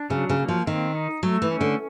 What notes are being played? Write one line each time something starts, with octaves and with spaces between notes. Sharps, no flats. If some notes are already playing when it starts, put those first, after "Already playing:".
Already playing: D4
C#3 F#3
C#3
A#3
F3
D#3 C4
D#4
F#3 A3
E3
C#4
D3